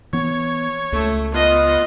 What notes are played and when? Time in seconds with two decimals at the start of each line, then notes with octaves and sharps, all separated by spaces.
0.13 E3 B3 C#5
0.92 C#2 A3
1.34 B3 F4 D#5